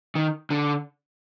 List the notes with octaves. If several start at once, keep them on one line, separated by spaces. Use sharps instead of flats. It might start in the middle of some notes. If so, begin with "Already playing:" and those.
D#3
D3